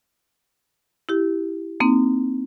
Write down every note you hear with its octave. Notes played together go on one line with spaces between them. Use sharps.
E4 G4
A#3 C4 D#4